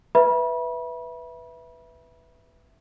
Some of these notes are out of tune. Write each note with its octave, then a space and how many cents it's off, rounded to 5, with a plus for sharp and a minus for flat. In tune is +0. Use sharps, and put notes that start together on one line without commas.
B4 +0 E5 +0 B5 -30